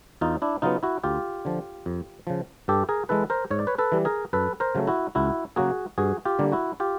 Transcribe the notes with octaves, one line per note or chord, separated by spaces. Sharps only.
E2 D#4 F4
D4 E4
C#3 F#3 B3 D#4 F4
E4 F#4
D2 F4 G4
D3 F3
F2
C#3 F3
G2 G4 A4
G#4 A#4
E3 G#3 A4 B4
A#4 C5
G#2 C#5
D5
B4 C#5
A4 B4
E3 G3
G#4 A#4
F#2 A4 B4
A#4 C5
C#3 F#3 A3
E4 F#4
C#2 E4 F#4
C#3 F#3 A#3 F#4 G#4
G2 F#4 G#4
F4 G4
D3 G3 A#3
E4 F#4
F4 G4